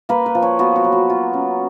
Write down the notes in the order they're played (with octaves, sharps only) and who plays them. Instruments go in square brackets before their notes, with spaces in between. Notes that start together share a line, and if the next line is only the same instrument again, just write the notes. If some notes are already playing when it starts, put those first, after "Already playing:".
[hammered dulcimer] A#3 B4
B4
F3
C#5
B3 F#4
F#4
F#3
F#4
F4
C#4